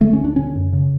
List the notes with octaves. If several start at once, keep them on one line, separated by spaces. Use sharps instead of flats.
D3 A3
C#4
D2
D4
D3 C#4
F#2
C#3